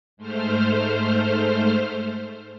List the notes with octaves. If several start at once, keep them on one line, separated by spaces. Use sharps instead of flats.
G#2 A3 C5 F6